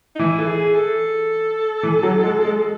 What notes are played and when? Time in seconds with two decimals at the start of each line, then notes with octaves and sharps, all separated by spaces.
0.15 D#4
0.19 E3 E4
0.39 A4
0.47 G#4
0.75 A4
1.83 E3
2.03 F#3
2.24 G#3
2.45 G#3